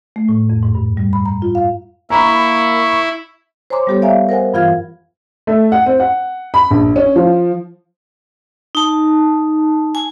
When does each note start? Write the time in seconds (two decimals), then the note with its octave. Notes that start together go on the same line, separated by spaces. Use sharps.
0.16 A3
0.29 A2
0.50 F2
0.63 G#2
0.75 G2
0.97 G3
1.13 B5
1.25 A#5
1.42 F4
1.55 F5
2.10 A#3 E4 A#5 B5 C#6
3.70 C5 C#5 G#5 A#5 C6 D6
3.87 G3 B3 G4 A4 C#5
4.02 D5 E5 F5 G#5 A#5
4.29 A#4 C5 F#5 G#5
4.53 G2 E3 F4 F5 F6 G#6
5.47 A3
5.72 F#5
5.86 C4
6.00 F#5
6.54 B5
6.71 A#1
6.96 C#4
7.16 F3
8.75 D#4 A5
9.95 G#5